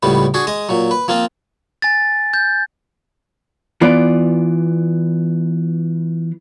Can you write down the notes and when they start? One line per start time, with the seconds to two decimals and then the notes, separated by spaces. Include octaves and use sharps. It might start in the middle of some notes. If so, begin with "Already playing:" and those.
0.03 C#2 A2 G3 B3
0.34 D4 F#4 G#4
0.47 G#3 D#5 D#6
0.69 A#2 F#3
0.91 B4
1.08 F3 A#3 C4 F4
1.82 G#5 A6
2.34 G6
3.81 E3 B3 F4 D5